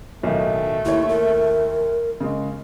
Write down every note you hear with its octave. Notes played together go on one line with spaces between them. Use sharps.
B1 A2 D#3 A3
D#2 E4 C#5
A#4
C#3 G#3